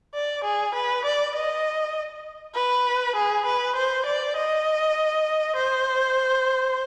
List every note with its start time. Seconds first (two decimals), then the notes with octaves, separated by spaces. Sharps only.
0.14 D5
0.44 G#4
0.75 B4
1.05 D5
1.35 D#5
2.55 B4
3.16 G#4
3.46 B4
3.76 C5
4.06 D5
4.36 D#5
5.56 C5